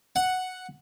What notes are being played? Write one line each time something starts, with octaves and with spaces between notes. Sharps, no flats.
F#5